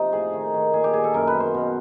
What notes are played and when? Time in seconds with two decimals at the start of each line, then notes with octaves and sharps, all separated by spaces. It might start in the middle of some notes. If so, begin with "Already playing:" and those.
Already playing: C3 F3 D#4
0.13 A2 G#4
0.33 D#3
0.54 D#3
0.74 A#2 G#4
0.84 G4
0.93 A#2 G#4
1.04 A4
1.14 F#2 A#4
1.27 B4
1.34 B3
1.40 C5
1.54 B2